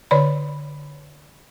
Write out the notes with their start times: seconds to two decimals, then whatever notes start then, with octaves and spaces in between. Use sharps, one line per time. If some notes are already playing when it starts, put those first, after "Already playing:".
0.11 D3 C#5 D5 B5